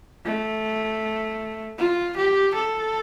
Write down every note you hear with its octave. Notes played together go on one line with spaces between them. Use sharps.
A3
F4
G4
A4